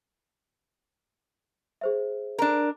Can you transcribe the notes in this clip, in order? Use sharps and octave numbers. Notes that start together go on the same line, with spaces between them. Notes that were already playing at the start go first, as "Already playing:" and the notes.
G#4 C5 E5
D4 A#4